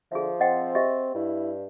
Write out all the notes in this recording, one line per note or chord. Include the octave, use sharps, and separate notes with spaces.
D3 F3 G#4 E5
C4 D#5 F#5 G5
G4 D#5 E5
G2 E4